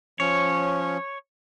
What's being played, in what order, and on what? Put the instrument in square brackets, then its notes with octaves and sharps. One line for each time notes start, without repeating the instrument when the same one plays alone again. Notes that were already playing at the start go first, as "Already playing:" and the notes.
[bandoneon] F3 C#4 [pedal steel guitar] C#5